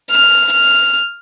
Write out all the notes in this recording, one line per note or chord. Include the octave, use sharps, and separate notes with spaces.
F6
F6